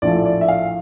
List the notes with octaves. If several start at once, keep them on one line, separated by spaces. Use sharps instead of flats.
A#1 A2 F3 A3 D5
D5
E5
F5